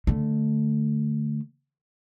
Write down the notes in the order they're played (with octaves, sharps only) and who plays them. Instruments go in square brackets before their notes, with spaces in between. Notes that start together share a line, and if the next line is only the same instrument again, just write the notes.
[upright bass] D3 A3